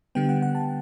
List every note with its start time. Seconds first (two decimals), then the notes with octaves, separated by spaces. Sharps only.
0.15 D3 G3 B3 G5
0.29 F#5
0.42 F#5
0.55 A5